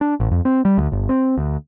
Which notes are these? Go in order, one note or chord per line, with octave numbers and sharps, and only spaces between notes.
D4
A1
F2
C4
G3
D2
G1
C4
D2